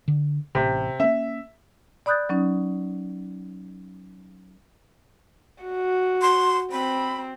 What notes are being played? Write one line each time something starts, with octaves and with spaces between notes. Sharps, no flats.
D3
A1 C3
A#3 C#4 E5
D5 B5 D#6 F#6 G6 A6
F#3 C#4 D#4
F#4
C6
C4 B5